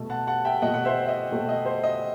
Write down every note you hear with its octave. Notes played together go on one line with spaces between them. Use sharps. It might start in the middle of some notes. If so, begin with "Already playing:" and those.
Already playing: B2 A3
F#5 A5
F#5 A5
E5 G5
B2 A3 D#5 F#5
F#5
C5 E5
E5
D#5
B2 A3
D#5
C5
D#5